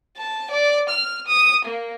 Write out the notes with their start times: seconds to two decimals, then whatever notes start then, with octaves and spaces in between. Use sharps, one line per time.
0.17 A5
0.51 D5
0.89 F6
1.27 D#6
1.65 A#3